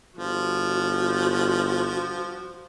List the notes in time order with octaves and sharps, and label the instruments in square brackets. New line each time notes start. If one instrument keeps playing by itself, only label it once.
[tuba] G1 [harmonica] F3 [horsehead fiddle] F#4